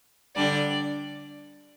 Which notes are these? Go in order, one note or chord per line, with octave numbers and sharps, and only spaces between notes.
D3 G3 D4 D5